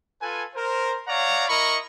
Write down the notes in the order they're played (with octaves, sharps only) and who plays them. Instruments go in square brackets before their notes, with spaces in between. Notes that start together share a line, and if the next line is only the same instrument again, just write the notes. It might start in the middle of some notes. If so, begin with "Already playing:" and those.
[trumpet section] F4 A4 B4 G#5
A#4 C5
C#5 D5 F5 F#5 A#5
E4 A#4 D#5 B5 C#6